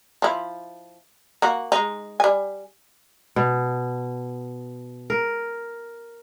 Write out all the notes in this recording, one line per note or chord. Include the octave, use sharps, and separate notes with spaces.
F3 E4
A#3 F#4
G#3 D#4
G3 G#5
B2
A#4